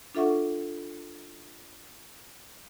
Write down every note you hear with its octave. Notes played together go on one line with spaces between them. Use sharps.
D4 F4 A4 E5 F#5 C#6